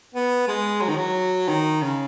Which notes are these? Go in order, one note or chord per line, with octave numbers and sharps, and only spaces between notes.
B3
G#3
F#3
D#3
F#3
D#3
C#3